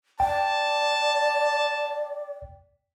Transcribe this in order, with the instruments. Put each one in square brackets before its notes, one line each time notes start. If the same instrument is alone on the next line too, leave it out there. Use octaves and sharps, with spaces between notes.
[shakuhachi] D5 [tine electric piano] G5 [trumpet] A5